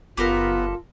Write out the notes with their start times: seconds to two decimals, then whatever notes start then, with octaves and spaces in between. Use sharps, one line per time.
0.17 F#1 B3 F4 G4 A4 A#4